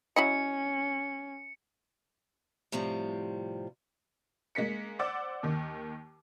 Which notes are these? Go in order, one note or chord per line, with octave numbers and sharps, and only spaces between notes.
F#3 C#4 E4 D#5 C#7
A2 C3 F3 G3
G#3 A#3 B6 C#7
C5 D5 F#5 D6 E6 A6
D#2 D#3